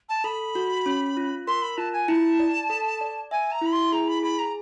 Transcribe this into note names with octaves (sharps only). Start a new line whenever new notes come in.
A5
A4 B5
F#4
C#4
F4
A#4 C6
B5
F4 A5
G#5
E4 A5
D5
A4
D5
E5 G#5
A#5
E4 B5
C6
G#4 A#5
B5
G#4 B5
A#5